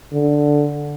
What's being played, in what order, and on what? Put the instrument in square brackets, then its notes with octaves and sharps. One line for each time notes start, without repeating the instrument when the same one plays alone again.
[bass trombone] D3